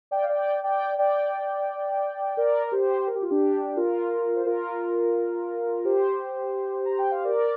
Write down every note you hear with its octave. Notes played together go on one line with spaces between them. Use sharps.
D5 G5
F5
D5 G5
D5 G5
D5 G5
A#4 D5
D5
G4 C5
A#4
G4
F4
D4 G4
F4 A#4
C5
F4 A#4
G4 C5
A#5
G5
F5
A#4 D5